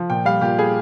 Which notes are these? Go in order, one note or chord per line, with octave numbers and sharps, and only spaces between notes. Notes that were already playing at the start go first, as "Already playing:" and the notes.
Already playing: F3
A#2 G5
G3 F5
A#2 G4
G3 G#4